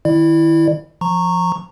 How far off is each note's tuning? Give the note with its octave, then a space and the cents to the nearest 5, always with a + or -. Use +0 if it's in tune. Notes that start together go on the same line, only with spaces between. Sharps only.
D#3 +0 E4 +0 D5 +35
F3 +0 A#5 -15 C#6 -10